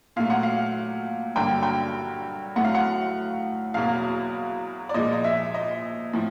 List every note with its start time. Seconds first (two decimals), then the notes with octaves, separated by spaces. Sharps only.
0.16 A#2 F#3 A3 F5
0.30 F#5
0.43 F5
1.36 G2 D3 F#3 A#3 G5
1.63 G5
2.56 A2 F#3 A3 F#5
2.64 F5
2.75 F#5
3.74 E2 B2 F#3 A#3 F5
4.89 D5
4.94 A#2 F3 G#3 D#5
5.13 D#5
5.24 E5
5.54 D#5
6.13 A2 F3